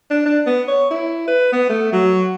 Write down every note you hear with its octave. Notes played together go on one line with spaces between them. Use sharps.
D4
D4
B3
C#5
E4
B4
B3
A3
F#3